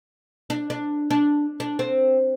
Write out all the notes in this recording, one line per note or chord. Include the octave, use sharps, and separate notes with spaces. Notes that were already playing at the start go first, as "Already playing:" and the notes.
D4
D4
D4
D4
C4